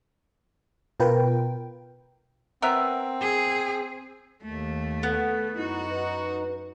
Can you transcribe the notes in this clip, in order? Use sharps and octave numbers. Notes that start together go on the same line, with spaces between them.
B2 F4 A#4 B4 G5
B3 C4 A#4 E5
G#4
D#2 A3
B3 A4
F#2 D#4 E4 F#4
B4